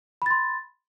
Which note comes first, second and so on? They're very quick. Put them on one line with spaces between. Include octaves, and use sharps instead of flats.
B5 A6 C6